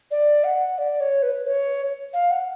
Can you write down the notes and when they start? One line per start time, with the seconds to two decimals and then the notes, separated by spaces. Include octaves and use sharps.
0.11 D5
0.44 F#5
0.78 D5
1.00 C#5
1.23 B4
1.46 C#5
2.13 F5
2.31 F#5